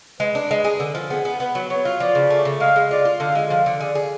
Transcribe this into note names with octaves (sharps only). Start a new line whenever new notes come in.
G#3 B4
D4
G#3
G#4
D3
F3
B3 G#4
B3
B3 B4
F#3
F#3 C#5
F4
F3 D5
C#3
A3
C#3
G#3 F5
G#3
F4 D5
F4
D3 F5
G#3
F3 F5
D3
G#4 D5
G#4